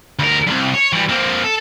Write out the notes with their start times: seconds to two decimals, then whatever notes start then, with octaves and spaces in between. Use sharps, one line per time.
0.19 D2 A#4
0.47 C2 G2
0.74 C#5
0.93 E3 G3
1.09 A#3 C4
1.44 A4